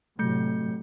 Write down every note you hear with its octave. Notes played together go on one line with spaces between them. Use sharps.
A2 C3 F#3 A3 G6 C#7